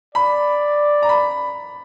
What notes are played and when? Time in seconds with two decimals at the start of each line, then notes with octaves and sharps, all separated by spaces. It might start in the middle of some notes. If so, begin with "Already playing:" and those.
0.15 D5 B5
1.02 A#5
1.09 B5